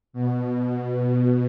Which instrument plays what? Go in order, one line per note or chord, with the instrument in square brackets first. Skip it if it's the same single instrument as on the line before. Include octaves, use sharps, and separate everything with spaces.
[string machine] B2